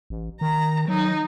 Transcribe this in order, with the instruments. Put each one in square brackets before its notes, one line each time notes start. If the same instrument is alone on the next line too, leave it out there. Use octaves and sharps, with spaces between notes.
[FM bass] A1
[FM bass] D#3 [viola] A#5
[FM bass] F#3 [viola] D#4